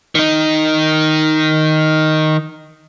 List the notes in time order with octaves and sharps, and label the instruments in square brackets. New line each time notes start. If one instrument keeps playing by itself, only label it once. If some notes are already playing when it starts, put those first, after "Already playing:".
[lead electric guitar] D#3 D#4